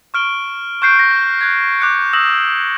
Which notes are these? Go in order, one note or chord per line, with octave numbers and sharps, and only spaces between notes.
C#6 F6 D7 G7
C#6 F#6 G6 C7 D7
A#6
F#6 G#6
D6 F#6 C#7
D#6 E6 F#6 A#6 E7 F#7